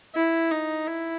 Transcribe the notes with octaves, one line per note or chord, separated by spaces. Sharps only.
E4
D#4
E4